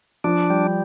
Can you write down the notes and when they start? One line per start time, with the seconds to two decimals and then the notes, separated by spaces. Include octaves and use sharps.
0.24 F3 D4
0.50 G3